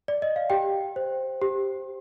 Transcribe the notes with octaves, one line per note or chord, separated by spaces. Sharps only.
D5
D#5
F5
G4 G5
C5
G4